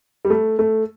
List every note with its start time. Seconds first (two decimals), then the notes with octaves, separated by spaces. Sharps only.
0.25 G3
0.30 A3
0.59 A3